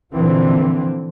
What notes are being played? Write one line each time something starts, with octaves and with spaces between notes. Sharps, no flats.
A#2 D3 E3 F3 C4